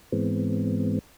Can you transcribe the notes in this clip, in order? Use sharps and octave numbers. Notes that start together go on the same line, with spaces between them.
G#2 E3 G#3 B3 C4